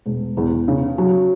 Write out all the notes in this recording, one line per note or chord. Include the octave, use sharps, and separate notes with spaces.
E1
E2
C#3
F#3